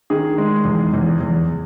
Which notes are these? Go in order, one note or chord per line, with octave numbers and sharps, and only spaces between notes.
D#3 G#4
G#3
E2
E2
E2